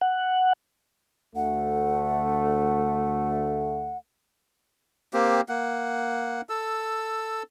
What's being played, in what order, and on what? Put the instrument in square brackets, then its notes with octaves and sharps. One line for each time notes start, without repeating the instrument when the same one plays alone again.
[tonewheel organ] F#5
[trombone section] D2 A3 [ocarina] F#5
[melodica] A#3 C4 G4
A#3 F#5
A4 E6